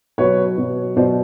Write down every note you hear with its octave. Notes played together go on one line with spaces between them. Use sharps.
B2 F#3 B4 C#5
B2 F#3
B2 F#3 C5 D5